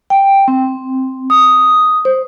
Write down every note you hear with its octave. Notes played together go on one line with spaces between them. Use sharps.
G5
C4
D#6
C5